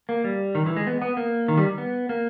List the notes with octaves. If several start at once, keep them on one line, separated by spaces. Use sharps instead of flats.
A#3
G3
D#3
E3
G#3
B3
B3
A#3
D#3
G3
B3
A#3